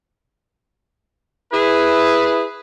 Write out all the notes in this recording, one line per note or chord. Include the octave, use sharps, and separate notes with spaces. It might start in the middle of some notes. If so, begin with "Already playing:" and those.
E4 G#4 B4